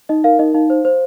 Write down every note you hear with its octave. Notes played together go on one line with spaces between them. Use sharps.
D#4 D#5
A#4 F5
D#4 D#5
D#4 F5
C5
C5